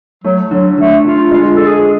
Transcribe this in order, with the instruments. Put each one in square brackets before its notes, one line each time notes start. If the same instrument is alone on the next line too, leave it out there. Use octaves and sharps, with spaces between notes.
[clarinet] F#3 [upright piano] A3
[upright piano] D3 [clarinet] F#3
[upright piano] D3 [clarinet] A3
[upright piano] D3 [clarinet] F4
[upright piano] G#3 [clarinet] F4
[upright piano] G#3 [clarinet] A4
[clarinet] G#4